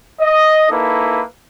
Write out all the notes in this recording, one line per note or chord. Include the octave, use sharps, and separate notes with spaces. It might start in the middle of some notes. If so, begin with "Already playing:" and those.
D#5
A#3 D#4 E4 A4 B4